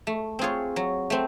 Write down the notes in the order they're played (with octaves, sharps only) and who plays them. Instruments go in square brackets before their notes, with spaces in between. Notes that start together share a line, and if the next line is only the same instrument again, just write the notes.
[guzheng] A3
C4 F4 G#4 C#5
F#3
A3 C4